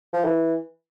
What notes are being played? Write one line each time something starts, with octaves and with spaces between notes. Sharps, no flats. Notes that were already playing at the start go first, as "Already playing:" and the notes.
F3
E3